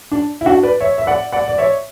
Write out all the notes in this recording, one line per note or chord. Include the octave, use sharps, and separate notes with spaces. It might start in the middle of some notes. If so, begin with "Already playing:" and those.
D4
E4
D4 F#4
B4 D5
C#5 E5
E5
D5 F#5
D5 F#5
D5
C#5 E5